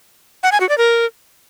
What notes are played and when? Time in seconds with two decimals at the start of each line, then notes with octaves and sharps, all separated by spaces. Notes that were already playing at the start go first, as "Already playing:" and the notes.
0.43 F#5
0.52 G#5
0.60 F#4
0.69 D5
0.78 A#4